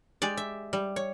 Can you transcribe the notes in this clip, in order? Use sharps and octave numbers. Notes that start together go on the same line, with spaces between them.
G#3 G4 D5
E5
G3
C#5